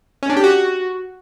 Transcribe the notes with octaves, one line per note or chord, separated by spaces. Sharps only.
C#4
D4
G4
F#4